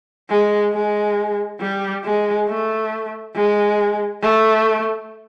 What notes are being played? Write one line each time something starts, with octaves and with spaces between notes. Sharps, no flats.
G#3
G#3
G3
G#3
A3
G#3
A3